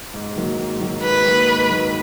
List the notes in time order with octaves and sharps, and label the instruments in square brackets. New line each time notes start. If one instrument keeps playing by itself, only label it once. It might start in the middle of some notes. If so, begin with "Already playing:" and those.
[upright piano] G#2
D#3 F#3 A#3
G#2
D#3 F#3 A#3
[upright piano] G#2 [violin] B4
[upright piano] D#3 F#3 A#3
G#2
D#3 F#3 A#3